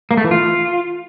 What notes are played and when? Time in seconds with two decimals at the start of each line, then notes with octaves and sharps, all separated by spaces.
0.11 A#3
0.17 A3
0.24 E3
0.31 F4